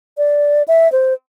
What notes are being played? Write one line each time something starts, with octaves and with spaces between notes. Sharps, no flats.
D5
E5
C5